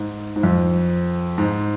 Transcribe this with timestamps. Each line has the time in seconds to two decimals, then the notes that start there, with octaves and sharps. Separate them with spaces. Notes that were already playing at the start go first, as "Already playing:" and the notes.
Already playing: G#2
0.36 G#2
0.43 F2
1.38 G#2